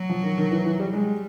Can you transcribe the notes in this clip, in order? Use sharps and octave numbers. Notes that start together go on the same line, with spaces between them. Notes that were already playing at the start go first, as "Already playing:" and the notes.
Already playing: F#3
F3
D#3
D#3
E3
E3
G3
G3 G#3